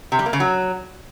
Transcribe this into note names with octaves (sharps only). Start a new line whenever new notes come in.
C3
G3
A#3
C#3
F#3